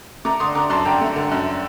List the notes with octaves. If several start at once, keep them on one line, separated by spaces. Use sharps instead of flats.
A3 A#5 D6
D3 C6 D#6
D3 A#5 D6
F#2 A5 C6
D3 G5 A#5
A3
D3
F#2